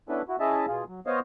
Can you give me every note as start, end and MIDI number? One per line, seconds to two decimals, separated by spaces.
0.09 0.22 59
0.09 0.22 61
0.09 0.22 62
0.09 0.22 64
0.09 0.22 69
0.09 0.22 71
0.29 0.36 64
0.29 0.36 66
0.40 0.66 61
0.40 0.66 64
0.40 0.66 68
0.40 0.66 75
0.40 0.66 76
0.40 0.66 81
0.67 0.84 47
0.67 0.84 65
0.67 0.84 68
0.88 1.00 54
1.07 1.20 59
1.07 1.20 72
1.07 1.20 73
1.07 1.20 75
1.07 1.20 77